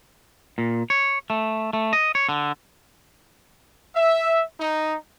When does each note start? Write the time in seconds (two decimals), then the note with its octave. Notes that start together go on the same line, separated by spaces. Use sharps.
0.58 A#2
0.90 C#5
1.30 A3
1.73 A3
1.93 D#5
2.15 C#5
2.29 D3
3.96 E5
4.60 D#4